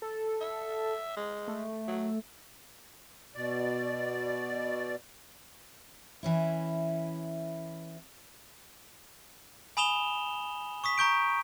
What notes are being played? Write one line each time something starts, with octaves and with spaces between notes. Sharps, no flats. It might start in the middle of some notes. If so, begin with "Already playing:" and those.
A4
E5
G#3
A3
F#3
B2 D5
E3 C#4 E4
G#5 B5 D#6 E7 F7 G7
C#6 D#6 B6
A#5 C#6 G6 D7